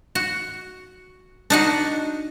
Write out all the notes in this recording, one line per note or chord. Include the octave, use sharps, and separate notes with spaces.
F#4
D4 D#4 F#4